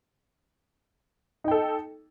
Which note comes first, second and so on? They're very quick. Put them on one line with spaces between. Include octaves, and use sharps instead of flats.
D#4 G5 A4